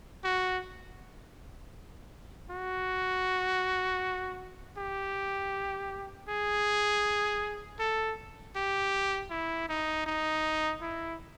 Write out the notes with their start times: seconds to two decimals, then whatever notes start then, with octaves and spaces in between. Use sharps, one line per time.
0.24 F#4
2.50 F#4
4.77 G4
6.28 G#4
7.79 A4
8.56 G4
9.30 E4
9.69 D#4
10.06 D#4
10.82 E4